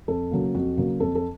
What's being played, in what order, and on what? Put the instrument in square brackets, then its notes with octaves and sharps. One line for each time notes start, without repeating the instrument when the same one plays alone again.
[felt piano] F2 A4
C#3 F#3 A#3
F2 F#4
C#3 F#3 A#3
F2 A4
A4